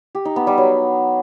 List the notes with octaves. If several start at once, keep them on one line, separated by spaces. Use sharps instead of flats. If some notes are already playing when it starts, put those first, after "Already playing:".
G4
D#4
B3
G3
F#3